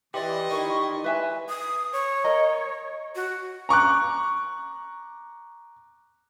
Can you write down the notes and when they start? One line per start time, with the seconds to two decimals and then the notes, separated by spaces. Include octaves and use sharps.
0.14 E3 G4 D5 D#5 C6
0.51 D#3 E4 C#6
1.04 B4 E5 G#5
1.49 D#6
1.93 C#5
2.24 A#4 D#5 A#5
3.15 F#4
3.69 A#5 C#6 D6 F#6